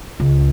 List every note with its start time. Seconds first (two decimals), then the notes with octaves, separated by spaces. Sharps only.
0.20 C#2